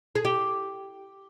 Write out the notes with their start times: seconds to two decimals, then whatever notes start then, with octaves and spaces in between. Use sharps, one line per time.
0.15 G#4
0.25 G4